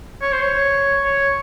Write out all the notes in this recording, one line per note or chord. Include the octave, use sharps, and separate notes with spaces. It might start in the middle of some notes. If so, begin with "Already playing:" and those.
C#5
C5
C#5
C#5